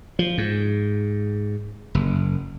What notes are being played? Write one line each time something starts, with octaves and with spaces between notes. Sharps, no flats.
F3
G#2
F#1